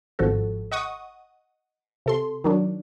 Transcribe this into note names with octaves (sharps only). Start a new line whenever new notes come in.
G#1 F3 F#4 A4
D#5 F#5 C#6 D#6
C3 A4 C6
D#3 F#3 D4